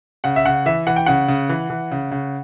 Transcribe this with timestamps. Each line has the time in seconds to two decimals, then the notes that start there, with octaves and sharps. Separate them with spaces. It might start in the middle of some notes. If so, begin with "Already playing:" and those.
0.24 C#3 F#5
0.36 E5
0.45 C#3 F#5
0.66 E3 E5
0.87 E3 F#5
0.96 G5
1.06 C#3 F#5
1.28 C#3
1.49 E3
1.70 E3
1.91 C#3
2.12 C#3